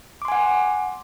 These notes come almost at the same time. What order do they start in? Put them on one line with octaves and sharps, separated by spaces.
D6 C6 G#5 F#5